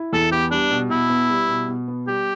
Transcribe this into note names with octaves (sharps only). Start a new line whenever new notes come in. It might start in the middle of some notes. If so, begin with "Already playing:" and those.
Already playing: E4
E2 A4
B3 G4
G3 D4
B2
B2 E4
B3
G3
B2
B2
B3
G3 G4